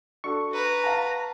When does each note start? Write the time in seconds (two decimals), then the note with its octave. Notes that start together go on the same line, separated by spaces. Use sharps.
0.24 D4 F#4 A4 C#6
0.54 B4 A#5
0.84 F5 F#5 A5